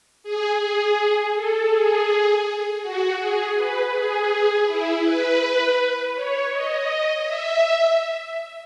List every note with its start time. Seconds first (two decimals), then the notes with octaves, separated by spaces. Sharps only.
0.23 G#4
0.60 G#4
1.35 A4
1.71 G#4
2.82 F#4
3.19 G#4
3.57 B4
3.93 G#4
4.67 E4
5.04 B4
6.15 C#5
6.52 D#5
7.26 E5